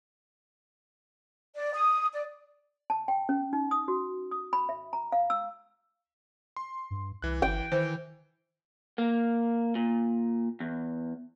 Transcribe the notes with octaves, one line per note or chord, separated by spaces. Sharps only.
D5
D#6
D5
A5
G5
C#4
D#4
D#6
F#4
D#6
B5
E5
A#5
F5
E6
C6
G2
C2 E3 F#6
G1 G5
D#3 E3 C5
A#3
A#2
E2